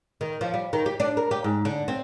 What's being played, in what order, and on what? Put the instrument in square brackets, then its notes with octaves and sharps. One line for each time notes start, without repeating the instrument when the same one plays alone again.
[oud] D#3
F3
G3
D#3
G4
D4
A#4
G4
G#2
D3
C4